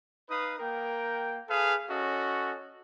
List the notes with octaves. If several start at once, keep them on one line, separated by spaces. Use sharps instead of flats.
D#4 B4 F5 D#6
A#3 A#4 G5
G#4 A4 B4 F5
C#4 F#4 A4 D#5